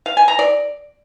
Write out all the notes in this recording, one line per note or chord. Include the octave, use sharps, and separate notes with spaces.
F5
G#5
A#5
D5